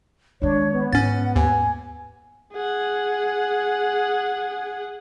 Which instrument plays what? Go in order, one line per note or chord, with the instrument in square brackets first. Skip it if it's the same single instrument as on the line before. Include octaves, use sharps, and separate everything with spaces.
[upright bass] D#3 G#3 [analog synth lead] D4 [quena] C#5
[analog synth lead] B3
[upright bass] G#2 [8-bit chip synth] C#4 A6 [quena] F#5
[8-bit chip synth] D#2 [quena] G#5
[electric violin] G#4 F#5